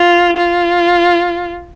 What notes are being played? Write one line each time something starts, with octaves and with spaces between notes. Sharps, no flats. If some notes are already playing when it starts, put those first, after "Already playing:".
Already playing: F4
F4